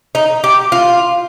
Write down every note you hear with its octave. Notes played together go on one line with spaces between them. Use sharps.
D#4
G4
F4